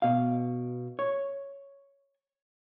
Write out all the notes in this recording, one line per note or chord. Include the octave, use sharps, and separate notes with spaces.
B2 F5
C#5